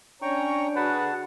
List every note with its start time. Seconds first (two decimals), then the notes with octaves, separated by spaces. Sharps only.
0.22 C#4 D4 C#5 G5 A#5 C#6
0.76 D3 F#4 G#4 B4 F#5 A5